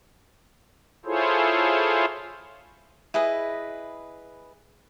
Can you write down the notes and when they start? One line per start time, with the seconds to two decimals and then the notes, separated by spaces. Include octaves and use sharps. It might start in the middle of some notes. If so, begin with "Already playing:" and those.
1.05 E4 F4 G#4 A4 C5 C#5
3.14 E4 G#4 B4 D#5